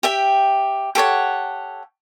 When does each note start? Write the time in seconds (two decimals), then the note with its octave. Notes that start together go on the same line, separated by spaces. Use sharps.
0.03 G4 E5 G5
0.95 G4 A4 C#5 F#5